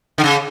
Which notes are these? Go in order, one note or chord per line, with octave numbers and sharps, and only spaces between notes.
D3
C#3